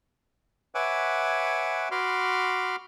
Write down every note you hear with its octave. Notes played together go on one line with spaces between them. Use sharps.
B4 C#5 E5 F#5 G#5 D6
F#4 B5 C6 D6 F6